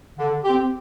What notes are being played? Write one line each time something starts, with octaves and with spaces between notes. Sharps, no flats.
D3
C4 G4